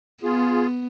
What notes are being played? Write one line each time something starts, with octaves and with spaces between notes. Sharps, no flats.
B3 F4 G#4